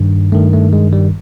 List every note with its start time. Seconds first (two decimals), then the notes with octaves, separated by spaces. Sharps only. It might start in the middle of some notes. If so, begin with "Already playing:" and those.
Already playing: G2 D#3
0.32 G2 D#3 A3
0.53 A3
0.73 G#3
0.93 G3